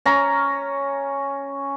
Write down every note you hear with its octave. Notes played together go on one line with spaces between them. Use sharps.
C#4 A#5